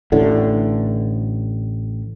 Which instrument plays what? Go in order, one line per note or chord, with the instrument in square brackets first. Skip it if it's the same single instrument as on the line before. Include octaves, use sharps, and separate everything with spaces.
[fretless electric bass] A1 A2 D3